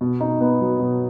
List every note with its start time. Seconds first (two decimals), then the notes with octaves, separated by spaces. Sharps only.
0.01 B2
0.21 D#4
0.41 B3
0.61 F#3
0.80 B2